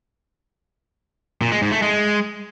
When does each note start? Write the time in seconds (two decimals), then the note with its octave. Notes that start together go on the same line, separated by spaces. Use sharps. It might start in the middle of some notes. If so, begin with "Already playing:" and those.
1.41 A#2
1.52 G#3
1.62 G#2
1.72 A3
1.82 G#3